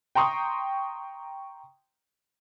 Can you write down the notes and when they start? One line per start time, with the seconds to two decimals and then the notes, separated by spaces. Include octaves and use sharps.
0.15 G5 A#5 C6 C#6 D#6